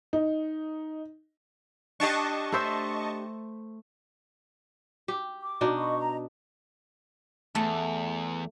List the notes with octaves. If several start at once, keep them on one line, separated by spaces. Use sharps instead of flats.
D#4
D4 G4 D#5 A5 C#6
A3 C5 E5
G4
D6
B2 D4 D#4
D#5 B5 C#6
D#5 A#5
E2 A3